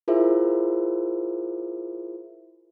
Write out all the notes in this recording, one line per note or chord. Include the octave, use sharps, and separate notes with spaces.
E4 F4 G#4 A#4 C5 E5